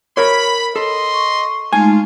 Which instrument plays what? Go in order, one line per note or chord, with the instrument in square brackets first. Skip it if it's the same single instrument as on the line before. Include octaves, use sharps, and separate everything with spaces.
[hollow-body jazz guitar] A#4 C#5 [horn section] B5
[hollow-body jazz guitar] A4 [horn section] D#5 C6
[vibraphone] C#6
[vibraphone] G#3 A3 D#4 [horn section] F4 [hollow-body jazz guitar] G#5